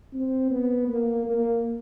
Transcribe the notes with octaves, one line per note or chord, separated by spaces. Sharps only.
C4
B3
A#3
A#3